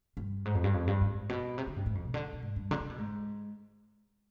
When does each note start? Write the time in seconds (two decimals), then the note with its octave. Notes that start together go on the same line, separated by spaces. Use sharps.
0.17 G2
0.45 G#2
0.55 F2
0.64 G2
0.74 F2
0.87 G2
1.01 G#2
1.29 B2
1.58 C3
1.67 D3
1.76 G2
1.86 G#2
1.95 F2
2.05 B2
2.14 D3
2.33 B2
2.43 G#2
2.56 G2
2.71 D3
2.80 C3
2.90 B2
2.98 G#2